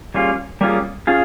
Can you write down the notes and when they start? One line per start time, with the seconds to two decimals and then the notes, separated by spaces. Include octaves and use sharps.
0.14 G3 A#3 C#4 F4 G#4
0.61 G3 A#3 C#4 F4 G#4
1.07 C#4 F4 G#4